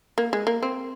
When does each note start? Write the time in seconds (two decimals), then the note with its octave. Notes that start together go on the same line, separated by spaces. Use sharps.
0.18 A#3
0.33 G#3
0.47 A#3
0.63 C4